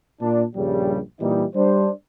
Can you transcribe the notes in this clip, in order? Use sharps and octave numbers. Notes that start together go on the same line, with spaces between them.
A#2 D4
A#1 G2 C#3 G3
A#2 E3 G3 D#4
G3 D4 C5